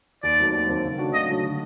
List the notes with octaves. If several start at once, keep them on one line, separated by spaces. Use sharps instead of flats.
D#2 D5
D#3 F#3 A3 C4
D#2
D#3 F#3 A3 C4
C#3
F#3 A3 D4 F#4
C#3 D#5
F#3 A3 D4 F#4
D3